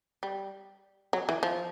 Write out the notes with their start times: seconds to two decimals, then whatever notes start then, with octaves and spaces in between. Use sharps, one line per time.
0.23 G3
1.13 F#3
1.29 E3
1.43 F3